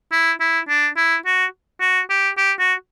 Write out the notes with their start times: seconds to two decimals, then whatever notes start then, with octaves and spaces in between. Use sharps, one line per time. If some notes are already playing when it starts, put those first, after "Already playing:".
0.12 E4
0.40 E4
0.69 D4
0.97 E4
1.26 F#4
1.81 F#4
2.10 G4
2.37 G4
2.59 F#4